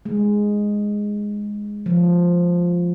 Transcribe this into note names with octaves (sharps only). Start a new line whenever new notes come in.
G#3
F3